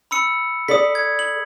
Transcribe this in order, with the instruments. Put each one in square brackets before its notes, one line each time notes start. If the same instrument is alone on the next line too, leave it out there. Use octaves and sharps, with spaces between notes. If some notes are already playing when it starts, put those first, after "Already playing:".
[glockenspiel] B5 E6 C#7
[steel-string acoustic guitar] A4 D5 D#5 [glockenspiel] D#6 B6
[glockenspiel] G#6
F#7